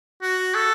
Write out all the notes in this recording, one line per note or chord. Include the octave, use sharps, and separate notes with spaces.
F#4
A4